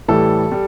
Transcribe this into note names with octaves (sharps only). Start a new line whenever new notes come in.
A2 E3 G3 A4
G3